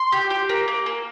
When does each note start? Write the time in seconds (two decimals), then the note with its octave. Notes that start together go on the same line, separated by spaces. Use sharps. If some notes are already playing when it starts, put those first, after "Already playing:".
Already playing: C6
0.12 G4
0.30 G4
0.49 A#3
0.68 A#3
0.86 A#3